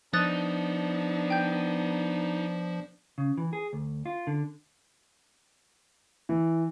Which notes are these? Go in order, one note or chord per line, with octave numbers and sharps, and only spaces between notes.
F3 B3 D4 D#4 D#6 F#6 A6
G5 G6
C#3
E3
G#4
D2
F4
D3
E3